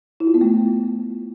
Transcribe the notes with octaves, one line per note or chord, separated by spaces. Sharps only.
E4
F4
B3
A3